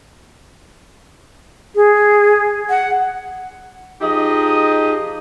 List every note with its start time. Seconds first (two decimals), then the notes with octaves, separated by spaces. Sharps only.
1.75 G#4
2.70 F#5
4.01 F3 D#4 G4 G#4 D#5